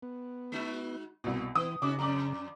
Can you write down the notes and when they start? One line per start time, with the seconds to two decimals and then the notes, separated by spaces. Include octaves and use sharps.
0.03 B3
0.52 G#3 D#4 F#4
1.24 C2 B2 A#3
1.55 E3 B3 D#6
1.82 C#3 C#4 D#4 F#4 D6
1.99 F2 D5 A#5 D6